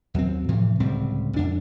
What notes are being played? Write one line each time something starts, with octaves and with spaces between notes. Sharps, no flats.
D#2 F#3 C4
A2 C3 E3 F3
D1 C#2 G3 C4
F2 D4